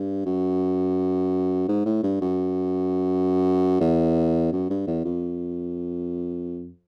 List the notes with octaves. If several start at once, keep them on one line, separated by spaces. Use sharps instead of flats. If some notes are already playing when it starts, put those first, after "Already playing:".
Already playing: G2
F#2
G#2
A2
G2
F#2
E2
F#2
G2
E2
F2